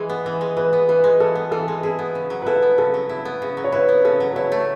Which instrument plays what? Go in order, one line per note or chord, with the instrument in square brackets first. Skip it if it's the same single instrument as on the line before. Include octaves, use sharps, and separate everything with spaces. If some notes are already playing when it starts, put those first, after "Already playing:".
Already playing: [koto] E3 G#3
B3
E3
G#3
[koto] E3 [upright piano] B4
[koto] B3
[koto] E3 [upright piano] B4
[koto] G#3
[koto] E3 [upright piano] A4
[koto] B3
[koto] E3 [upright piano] A4
[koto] G#3
[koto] E4 [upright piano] G#4
[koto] B3
C#3
F#3
[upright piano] B4
[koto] E4 [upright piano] A4
[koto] B3
[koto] C#3 [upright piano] A4
[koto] F#3
E4
B3
C#3
F#3
[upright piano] C#5
[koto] E4 [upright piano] B4
[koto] B3
[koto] C#3 [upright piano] A4
[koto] F#3
[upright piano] B4
[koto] E4 [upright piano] C#5
[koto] A3